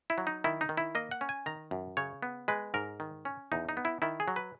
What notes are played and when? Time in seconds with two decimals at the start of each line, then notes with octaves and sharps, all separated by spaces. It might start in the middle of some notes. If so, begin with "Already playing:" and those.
0.10 E4
0.18 F#3
0.27 D#4
0.44 D#3 E4
0.61 D#4
0.69 D#3
0.77 E4
0.95 A#3 D#5
1.11 F#5
1.21 C#4
1.29 G#5
1.46 D#3 A#5
1.71 F#2
1.97 C#3 C#5
2.23 B3
2.48 G#3 B4
2.74 G#2 A#4
3.00 D#3
3.25 C#4
3.52 E2 D#4
3.69 D#4
3.77 B3
3.85 E4
4.02 D#3 E4
4.20 G#4
4.28 F#3
4.36 B4